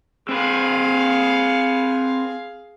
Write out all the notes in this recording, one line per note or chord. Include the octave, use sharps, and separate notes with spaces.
C4 G#4 B4 F5